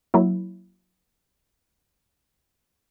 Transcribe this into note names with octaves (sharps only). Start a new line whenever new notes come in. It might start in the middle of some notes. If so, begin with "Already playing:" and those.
F#3 A#3 E4